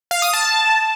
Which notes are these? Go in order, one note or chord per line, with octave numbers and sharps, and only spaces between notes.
F5
D#6
A5